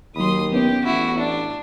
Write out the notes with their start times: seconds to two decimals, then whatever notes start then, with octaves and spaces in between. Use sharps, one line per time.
0.16 D#2 F#3 B5 C6 D#6
0.53 B3 C#4 G4
0.85 A1 E4 F#4
1.18 D4